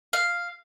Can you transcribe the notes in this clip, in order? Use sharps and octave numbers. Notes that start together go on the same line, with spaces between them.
F5